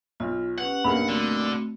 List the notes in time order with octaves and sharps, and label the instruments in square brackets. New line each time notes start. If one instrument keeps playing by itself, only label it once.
[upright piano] B1 [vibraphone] F4
[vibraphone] C#4 G4 B4 [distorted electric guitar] F#5
[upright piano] B1 G2 A#3 [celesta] B5
[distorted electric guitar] D3 [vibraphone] A3 C4 F#4